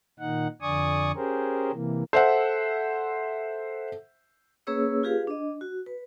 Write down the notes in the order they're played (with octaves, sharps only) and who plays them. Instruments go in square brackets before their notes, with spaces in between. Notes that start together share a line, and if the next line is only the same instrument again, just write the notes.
[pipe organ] A#2 D#3 D#4 F#5
F2 D3 D5 G#5 C#6 D#6
C#4 G4 G#4 A#4 C5
C3 E3 A#3
[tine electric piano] A4 [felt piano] C5 E5 F#5
[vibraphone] A#3 C#4 G#4 B4 C#5 E6
F4 G4 G#4 B4 F5
D4 D#5
F#4
B4